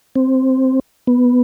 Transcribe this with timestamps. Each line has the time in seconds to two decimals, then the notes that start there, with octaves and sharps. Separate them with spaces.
0.16 C4
1.07 B3